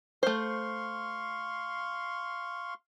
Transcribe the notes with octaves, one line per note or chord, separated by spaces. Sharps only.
A3 C5 F5 C6 C#6